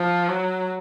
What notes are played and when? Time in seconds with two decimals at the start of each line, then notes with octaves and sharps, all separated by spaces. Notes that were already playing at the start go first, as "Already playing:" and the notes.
Already playing: F3
0.28 F#3